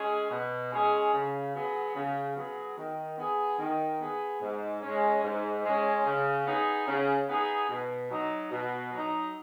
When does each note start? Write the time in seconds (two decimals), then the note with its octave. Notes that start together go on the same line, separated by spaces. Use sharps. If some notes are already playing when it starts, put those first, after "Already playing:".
Already playing: G#3 C#4 G#4
0.30 B2
0.72 G#3 C#4 G#4
1.14 C#3
1.55 F#3 B3 G#4
1.95 C#3
2.37 F#3 B3 G#4
2.77 D#3
3.18 B3 G#4
3.59 D#3
4.00 B3 G#4
4.41 G#2
4.82 C#4
4.87 G#3
5.24 G#2
5.65 G#3 C#4
6.06 C#3
6.47 B3 D#4 G#4
6.87 C#3
7.29 B3 D#4 G#4
7.70 B2
8.11 F#3 D#4
8.51 B2
8.92 F#3 D#4